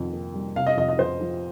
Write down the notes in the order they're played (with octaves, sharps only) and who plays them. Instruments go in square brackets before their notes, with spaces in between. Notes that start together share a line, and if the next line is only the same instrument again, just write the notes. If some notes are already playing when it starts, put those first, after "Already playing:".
Already playing: [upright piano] F2 D#3
A#3
G3
C3 F5
D#5
F2 D#5
D#5
F2 C5
F3